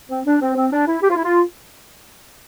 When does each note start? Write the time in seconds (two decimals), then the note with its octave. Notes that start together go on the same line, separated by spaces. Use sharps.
0.09 C4
0.25 D4
0.41 C4
0.55 C4
0.72 D4
0.86 E4
1.01 G4
1.10 F4
1.16 E4
1.23 F4